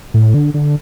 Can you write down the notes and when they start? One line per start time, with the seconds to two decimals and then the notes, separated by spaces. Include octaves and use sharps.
0.14 A2
0.34 D3
0.54 D3